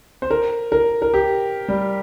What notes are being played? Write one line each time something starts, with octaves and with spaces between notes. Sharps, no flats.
C5
A#4
A#4
A#4
G4
G3